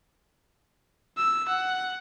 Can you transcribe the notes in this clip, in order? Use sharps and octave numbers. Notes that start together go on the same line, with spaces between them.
E6
F#5